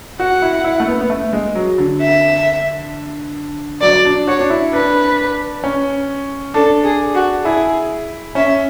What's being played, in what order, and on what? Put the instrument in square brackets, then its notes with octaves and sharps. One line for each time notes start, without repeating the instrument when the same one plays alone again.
[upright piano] F#4 [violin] F#5
[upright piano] E4
E4
A3
B3
B3
A3
G#3
F#3
D3
[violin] E5
[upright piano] F#3 [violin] D5
[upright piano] D4
[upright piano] F#4 [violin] C#5
[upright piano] D4
E4
[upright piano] D4 [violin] B4
[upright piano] C#4
[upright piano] D4 [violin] A4
[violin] G#4
F#4
[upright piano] E4 [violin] G#4
[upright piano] C#4 [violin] E5